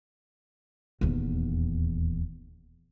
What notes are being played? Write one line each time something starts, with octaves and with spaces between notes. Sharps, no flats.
D#1 E2